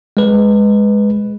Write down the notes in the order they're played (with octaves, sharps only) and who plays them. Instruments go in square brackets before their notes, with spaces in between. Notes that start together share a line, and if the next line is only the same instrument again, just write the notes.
[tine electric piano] G#3 B4